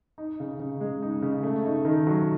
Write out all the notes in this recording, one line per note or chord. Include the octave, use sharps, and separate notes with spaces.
D#4
C#3
C#3
G#3
D#4
C#3
A3
D#4
D#3
F#3